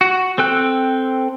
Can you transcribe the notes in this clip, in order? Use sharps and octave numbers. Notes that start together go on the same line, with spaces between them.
F#4
C4 A4 G5 F#6